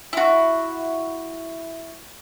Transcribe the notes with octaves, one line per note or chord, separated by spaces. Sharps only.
E4 F#4